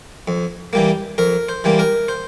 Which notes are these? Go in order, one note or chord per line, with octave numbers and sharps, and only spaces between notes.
F2
E3 G3 A#3
F2 A#4
C5
E3 G3 A#3
A#4
C5